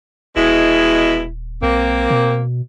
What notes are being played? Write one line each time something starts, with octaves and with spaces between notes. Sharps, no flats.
D#1 B2 G#3 E4
B1 A#3 C4
B2